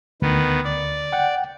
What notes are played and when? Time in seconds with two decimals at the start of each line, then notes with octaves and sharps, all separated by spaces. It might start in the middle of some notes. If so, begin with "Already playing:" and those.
0.22 D2 D#3 B3
0.65 D5
1.12 F#5 G5